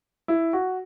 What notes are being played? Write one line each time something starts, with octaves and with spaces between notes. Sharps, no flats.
E4
F#4